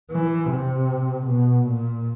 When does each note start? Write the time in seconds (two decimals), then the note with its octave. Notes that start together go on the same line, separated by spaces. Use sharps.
0.12 E3
0.51 C3
1.27 B2
1.67 A#2